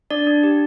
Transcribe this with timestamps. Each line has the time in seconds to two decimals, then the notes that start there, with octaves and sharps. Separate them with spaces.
0.10 D4 D5
0.27 D4
0.43 G4